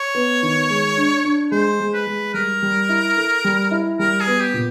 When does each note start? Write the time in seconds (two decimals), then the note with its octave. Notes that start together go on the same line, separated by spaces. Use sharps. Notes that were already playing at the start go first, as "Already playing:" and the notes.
Already playing: C#5
0.15 B3
0.43 D#3
0.70 G#3
0.97 D4
1.25 D4
1.52 G#3 C5
1.80 G#3
1.93 B4
2.07 G#3
2.34 G3 A#4
2.62 G3
2.89 E4
3.17 A4
3.44 G3
3.71 E4
3.99 G3 A#4
4.20 G#4
4.26 B3
4.41 G4
4.54 A#2